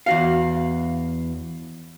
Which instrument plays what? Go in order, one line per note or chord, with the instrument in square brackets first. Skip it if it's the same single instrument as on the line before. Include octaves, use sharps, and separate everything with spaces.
[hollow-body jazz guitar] E2 F#4 F5